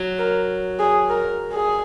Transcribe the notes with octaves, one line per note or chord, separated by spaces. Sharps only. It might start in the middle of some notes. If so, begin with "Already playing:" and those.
Already playing: F#3
A#4
G#4
A#4
G#4